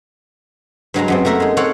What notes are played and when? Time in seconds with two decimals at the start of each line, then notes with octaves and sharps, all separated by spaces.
0.94 G2 F#3 G#3 A#5
1.08 F#2 B3 C4
1.25 A3 A#3 A#4 E5 F#5
1.40 G#3 D#4
1.57 C4 A4 C5 C#5 F5 F#5